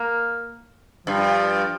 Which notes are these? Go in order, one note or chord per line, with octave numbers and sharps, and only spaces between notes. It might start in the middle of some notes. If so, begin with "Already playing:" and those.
Already playing: A#3
G2 F3